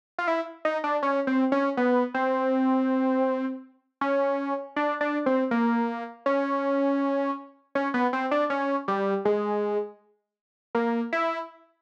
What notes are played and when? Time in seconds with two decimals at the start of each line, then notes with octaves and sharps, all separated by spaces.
0.18 F4
0.28 E4
0.65 D#4
0.84 D4
1.03 C#4
1.27 C4
1.52 C#4
1.77 B3
2.14 C4
4.01 C#4
4.76 D4
5.01 D4
5.26 C4
5.51 A#3
6.26 C#4
7.75 C#4
7.94 B3
8.13 C4
8.31 D4
8.50 C#4
8.88 G3
9.25 G#3
10.75 A#3
11.12 E4